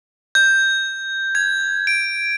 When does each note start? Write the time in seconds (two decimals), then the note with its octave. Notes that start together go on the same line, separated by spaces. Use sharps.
0.35 G6
1.35 G#6
1.87 D7